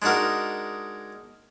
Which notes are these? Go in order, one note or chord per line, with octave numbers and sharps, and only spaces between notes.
G#3 D4 D#4 F#4 A#4